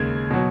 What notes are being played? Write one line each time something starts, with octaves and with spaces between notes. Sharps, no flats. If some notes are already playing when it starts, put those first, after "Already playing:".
Already playing: D#2 C#3 G#3 G#6
B2 F#3